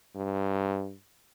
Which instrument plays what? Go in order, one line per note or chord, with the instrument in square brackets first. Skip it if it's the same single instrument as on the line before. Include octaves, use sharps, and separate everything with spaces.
[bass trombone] G2